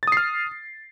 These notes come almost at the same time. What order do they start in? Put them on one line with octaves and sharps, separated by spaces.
A6 D#6 C7 F6